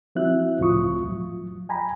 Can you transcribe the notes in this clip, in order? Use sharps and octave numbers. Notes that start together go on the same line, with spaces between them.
F3 C4 E4 F#4 E5 F#6
C#2 A2 F3 F4 C#6 D#6
F3 F#3
G5 G#5 A#5 B5